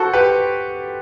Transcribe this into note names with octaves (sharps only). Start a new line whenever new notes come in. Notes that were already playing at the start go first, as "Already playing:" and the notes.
Already playing: F#4 A4 C5
G4 B4